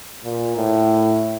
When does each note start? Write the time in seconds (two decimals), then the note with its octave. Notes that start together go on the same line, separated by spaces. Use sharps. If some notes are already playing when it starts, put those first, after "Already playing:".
0.24 A#2
0.56 A2